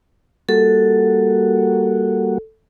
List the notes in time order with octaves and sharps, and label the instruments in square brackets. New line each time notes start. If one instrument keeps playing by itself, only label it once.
[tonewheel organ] G3 A#3 F#4 [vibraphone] A4